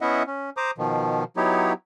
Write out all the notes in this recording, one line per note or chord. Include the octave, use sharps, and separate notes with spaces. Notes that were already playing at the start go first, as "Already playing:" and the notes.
B3 C#4 E4 D#5 E5 F#5
C#4
C5 A#5 D6 D#6
B2 D#3 F3
F#3 B3 D#4 E4 G4 C#5